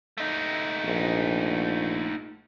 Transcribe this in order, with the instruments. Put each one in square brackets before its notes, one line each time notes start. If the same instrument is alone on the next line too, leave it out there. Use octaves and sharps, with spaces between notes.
[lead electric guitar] A3 D#4
[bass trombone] A#1